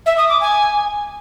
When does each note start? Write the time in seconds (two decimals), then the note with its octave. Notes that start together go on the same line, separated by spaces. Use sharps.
0.06 E5
0.17 D#6
0.29 D6
0.41 G#5